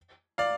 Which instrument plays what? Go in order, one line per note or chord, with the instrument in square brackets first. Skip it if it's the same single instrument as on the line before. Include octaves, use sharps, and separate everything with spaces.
[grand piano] D5 F5